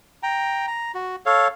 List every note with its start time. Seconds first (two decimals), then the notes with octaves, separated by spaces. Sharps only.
0.23 G5 A#5
0.68 A#5
0.95 F#4
1.26 A4 C#5 F5